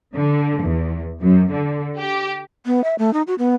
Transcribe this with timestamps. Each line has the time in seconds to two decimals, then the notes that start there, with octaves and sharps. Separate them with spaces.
0.16 D3
0.62 E2
1.21 F#2
1.52 D3
1.98 G4
2.66 B3
2.84 E5
2.99 A3
3.14 D#4
3.27 F#4
3.39 B3